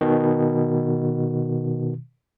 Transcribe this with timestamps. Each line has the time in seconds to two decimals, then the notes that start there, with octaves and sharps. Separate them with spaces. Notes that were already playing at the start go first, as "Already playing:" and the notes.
0.01 B2 D#3